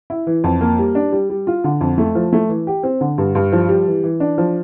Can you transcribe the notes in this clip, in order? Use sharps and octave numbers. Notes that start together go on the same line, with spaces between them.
E4
E3
F2
A#3
G3
D4
G3
G3
F4
D3
F2
A3
F3
A3
E3
G4
C4
D3
G2
G2
F3
G3
E3
E3
D4
F3